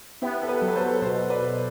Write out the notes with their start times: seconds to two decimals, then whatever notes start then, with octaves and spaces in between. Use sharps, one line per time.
0.22 B3 E4 G4
0.42 A4
0.49 G4 B4
0.61 F#3 A4
0.68 B4
0.76 A4 C5
1.02 B2 A4 C5
1.30 B4 D5
1.43 B2